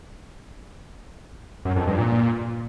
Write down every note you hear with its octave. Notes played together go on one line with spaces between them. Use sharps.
F#2
F2
G2
A#2